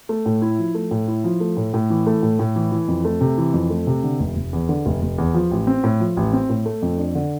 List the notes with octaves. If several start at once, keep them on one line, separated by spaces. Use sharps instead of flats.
A3
A2
E4
F3
A3
A2
E4
F3
A3
A2
A2
E3
A3
A2
A2
E3
E3
F2
A3
C3
E3
F2
A3
C3
D3
F1
F1
E2
D3
F1
F1
E2
F3
A1
C4
A2
F3
A1
C4
A2
A3
F2
D4
D3